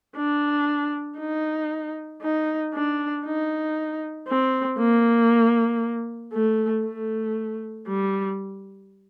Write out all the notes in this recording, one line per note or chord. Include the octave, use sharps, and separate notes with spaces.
D4
D#4
D#4
D4
D#4
C4
A#3
A3
A3
G3